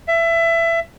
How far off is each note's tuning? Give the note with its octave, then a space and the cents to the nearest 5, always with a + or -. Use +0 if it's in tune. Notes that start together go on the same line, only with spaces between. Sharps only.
E5 +20